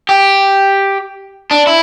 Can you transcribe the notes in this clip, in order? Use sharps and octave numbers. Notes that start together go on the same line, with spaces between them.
G4
D4
E4